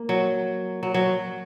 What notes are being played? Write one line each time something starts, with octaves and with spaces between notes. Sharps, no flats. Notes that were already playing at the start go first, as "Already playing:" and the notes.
Already playing: A#3
F#3
F#3
F#3